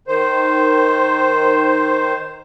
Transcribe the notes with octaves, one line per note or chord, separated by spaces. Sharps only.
D#3 C5